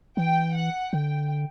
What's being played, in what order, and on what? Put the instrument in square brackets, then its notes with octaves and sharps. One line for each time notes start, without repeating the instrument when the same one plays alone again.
[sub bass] E3 [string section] G5
[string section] F#5
[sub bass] D3 [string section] G5